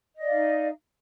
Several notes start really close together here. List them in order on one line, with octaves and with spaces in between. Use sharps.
D#5 D5 F5 D#4